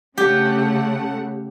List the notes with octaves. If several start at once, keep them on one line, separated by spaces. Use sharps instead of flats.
C#3 A3 G4 F#5